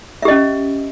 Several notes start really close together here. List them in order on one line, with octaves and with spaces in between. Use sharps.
E5 G4 D#5 C#4